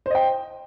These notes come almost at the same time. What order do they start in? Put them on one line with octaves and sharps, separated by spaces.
C5 D#5 G5